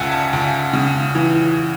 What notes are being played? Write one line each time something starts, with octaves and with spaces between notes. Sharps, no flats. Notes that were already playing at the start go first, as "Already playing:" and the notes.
Already playing: C#2 C#3 E5 F#5 G#5 A5
A5
C#2
C#3
E3